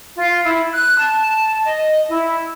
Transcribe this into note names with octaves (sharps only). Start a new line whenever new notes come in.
F4
E4
F#6
A5
D#5
E4